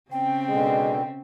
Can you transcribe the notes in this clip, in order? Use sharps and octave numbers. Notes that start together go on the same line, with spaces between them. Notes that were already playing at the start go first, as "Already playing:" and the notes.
C#3 C4 C#4 G5
B2 D3 G#3